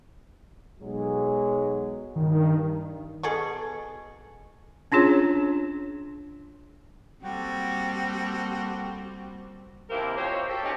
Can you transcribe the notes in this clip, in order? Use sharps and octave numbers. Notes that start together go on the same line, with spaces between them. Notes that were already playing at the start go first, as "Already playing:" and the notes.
B1 F#3 G#3
G2 D#3
B2 G#4 A4 C#6
C#4 D4 F4 G#4 C#5
G3 A#3 C4 F#4 A4 G5
D#2 C3 A#3 E4 A#4 C5
F3 D#4 F#4 G4 C5 C#5
G4 A4
C4 C#4 D#4